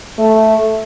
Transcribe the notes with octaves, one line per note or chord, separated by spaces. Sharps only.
A3